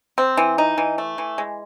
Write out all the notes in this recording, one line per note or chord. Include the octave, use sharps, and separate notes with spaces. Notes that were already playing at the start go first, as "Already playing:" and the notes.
C4
E3
D#4
E3
A3
E3
G#3